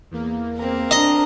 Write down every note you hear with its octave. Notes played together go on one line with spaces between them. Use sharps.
E2 A#3
C4 A#4
D4 D#5 A#5